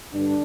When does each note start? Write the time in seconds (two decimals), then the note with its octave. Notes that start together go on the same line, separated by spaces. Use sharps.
0.13 G2 D3 D4